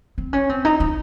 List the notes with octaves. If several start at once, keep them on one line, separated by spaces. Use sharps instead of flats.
C4
C#4
C4
D#4
D#4